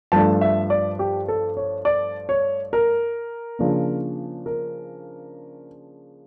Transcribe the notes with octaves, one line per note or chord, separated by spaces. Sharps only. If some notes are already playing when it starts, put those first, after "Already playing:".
G2 F3 A3 D4 A5
E5
D5
G4
A4
C#5
D5
C#5
A#4
C#3 F3 A#3 D4
A#4